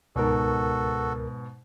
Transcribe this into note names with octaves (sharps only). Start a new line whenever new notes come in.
C#2 G#2 B2 F#4 A4 A#4